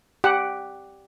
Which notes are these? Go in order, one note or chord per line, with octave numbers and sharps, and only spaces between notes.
G4 F#5